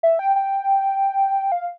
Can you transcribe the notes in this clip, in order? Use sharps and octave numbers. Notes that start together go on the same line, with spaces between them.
E5
G5
G5
F5